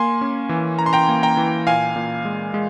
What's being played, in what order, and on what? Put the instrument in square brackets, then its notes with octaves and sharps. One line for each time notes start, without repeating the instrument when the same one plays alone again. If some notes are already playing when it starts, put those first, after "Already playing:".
Already playing: [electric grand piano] A#3 G#5 C6
C#4
E3
E3 A#5
C6
G5 A#5
A#3
G5 A#5
E3
A#2 F5 G#5
A#2
G#3
G#3